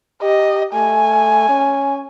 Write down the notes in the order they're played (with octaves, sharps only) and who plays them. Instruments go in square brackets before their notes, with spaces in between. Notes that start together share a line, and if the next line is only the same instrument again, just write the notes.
[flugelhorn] G4 [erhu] D#5
[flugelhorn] A3 [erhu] G#5
[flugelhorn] C#4